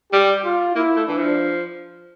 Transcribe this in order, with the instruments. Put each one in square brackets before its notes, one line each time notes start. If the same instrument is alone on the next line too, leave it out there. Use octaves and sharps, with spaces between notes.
[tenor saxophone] G3 [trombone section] G4
[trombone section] F4
[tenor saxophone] A#3 [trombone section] E4
[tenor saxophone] A3
[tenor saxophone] E3 [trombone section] D4
[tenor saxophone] F3